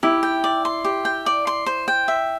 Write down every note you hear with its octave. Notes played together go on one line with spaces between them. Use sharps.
E4 G4
G5
D5
C6
G4
G5
D5
C6
C5
G5
E5